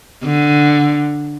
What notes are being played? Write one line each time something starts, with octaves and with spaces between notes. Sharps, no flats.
D3